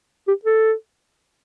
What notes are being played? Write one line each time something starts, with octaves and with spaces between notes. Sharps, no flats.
G4
A4